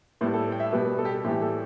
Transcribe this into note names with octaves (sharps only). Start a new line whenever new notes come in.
A2 G3 B4
A4
G5
E5
B2 G3 B4
B4
A4
G4
A4
A2 E3 G3 G4
A4